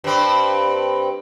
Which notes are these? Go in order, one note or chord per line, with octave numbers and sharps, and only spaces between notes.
G2 C4